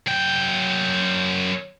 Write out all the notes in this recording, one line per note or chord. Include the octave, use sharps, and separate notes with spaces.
F#2 G5